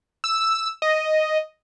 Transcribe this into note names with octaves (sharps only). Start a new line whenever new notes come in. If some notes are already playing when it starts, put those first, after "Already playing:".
E6
D#5